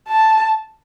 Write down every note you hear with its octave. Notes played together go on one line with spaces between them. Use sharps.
A5